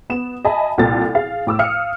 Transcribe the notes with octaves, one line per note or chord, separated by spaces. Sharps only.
B3 E7
D#5 E5 G#5 A5 B5
C2 A#2 A4 A6
G#4 F5
A2 D6 E6
F5 D#6 F6 C#7